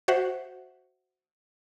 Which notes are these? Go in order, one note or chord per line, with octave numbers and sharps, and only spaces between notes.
F#4 C5 E5 F#5